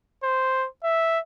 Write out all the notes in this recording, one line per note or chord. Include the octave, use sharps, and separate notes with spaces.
C5
E5